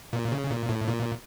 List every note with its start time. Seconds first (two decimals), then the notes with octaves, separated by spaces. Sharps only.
0.13 A#2
0.32 C#3
0.50 A#2
0.69 A2
0.87 A#2